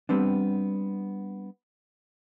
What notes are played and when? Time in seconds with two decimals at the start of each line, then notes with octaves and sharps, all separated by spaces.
0.09 G3 B3 C4 D4